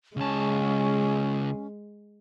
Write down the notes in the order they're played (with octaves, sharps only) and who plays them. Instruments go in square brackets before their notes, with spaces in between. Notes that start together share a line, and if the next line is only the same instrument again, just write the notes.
[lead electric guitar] C#2 A5 [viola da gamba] G#3 [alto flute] C#4